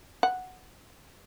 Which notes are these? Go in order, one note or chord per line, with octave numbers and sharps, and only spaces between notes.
F#5